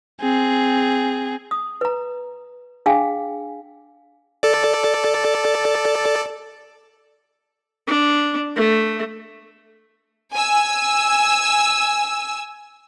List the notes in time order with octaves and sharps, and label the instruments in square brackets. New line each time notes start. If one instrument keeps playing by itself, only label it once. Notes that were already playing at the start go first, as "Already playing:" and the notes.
[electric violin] C4 G#4
[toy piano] D#6
B4 A#5
D4 G#4 F5 G5 G#5
[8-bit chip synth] A4 D5
[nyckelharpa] D4
A3
[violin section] G#5 E6